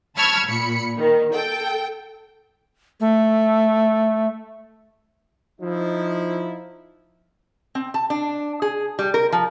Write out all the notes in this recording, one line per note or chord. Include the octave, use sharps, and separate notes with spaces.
A5 B5 C#6 E6 F6 G#6
A#2 B5 C#7
D#3
A4 G5
A3
F3 D#4 E4
C4
A5
D4
G#4
G3
A#4
F3